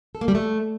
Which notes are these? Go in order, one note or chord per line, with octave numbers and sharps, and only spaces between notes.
A4
A#3
G3
A3